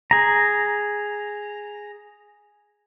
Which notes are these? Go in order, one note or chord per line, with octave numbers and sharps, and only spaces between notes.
G#4 A#5